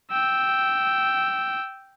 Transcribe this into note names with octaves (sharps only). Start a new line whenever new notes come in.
G5 E6